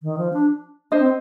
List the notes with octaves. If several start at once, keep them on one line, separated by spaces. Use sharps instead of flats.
D#3
F3
D4
D4 C5 D#5
C4